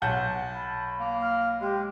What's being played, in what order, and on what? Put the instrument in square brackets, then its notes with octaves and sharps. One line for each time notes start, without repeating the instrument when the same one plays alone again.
[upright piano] B1 F#5 G6 [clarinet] A5
[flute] B5
[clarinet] A#3
[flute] F6
[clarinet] G#3 [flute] G4